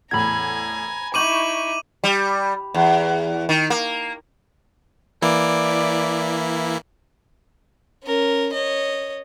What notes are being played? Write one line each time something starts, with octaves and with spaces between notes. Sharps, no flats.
E2 A2 E3 G#5 A#5 B5 G#6
D#4 E4 C#6 D6 G6 D#7 F#7
G3
E2
D#3
A#3
E3 A#3 E4 D5
C#4 A#4
C#5 D#5